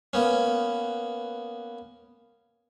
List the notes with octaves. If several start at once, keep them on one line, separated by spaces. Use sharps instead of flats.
A#3 B3 C#4